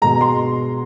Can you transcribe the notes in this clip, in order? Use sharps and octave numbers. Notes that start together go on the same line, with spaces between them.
B2 G#3 A#5
C6